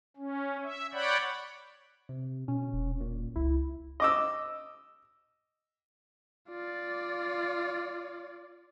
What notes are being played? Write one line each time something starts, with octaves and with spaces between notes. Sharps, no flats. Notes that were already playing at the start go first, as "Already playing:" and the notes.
C#4
E5
C#5 D5 F#5 G5 B5
C3
B2 C#4
E1
A#2
C#2 E4
D#5 D6 E6
F4 D5